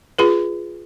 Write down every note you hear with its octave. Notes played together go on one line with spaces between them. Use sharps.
F4 G#4 B4